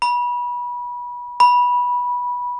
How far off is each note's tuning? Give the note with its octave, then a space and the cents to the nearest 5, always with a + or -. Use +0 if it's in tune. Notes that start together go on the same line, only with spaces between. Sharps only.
B5 -25
B5 -15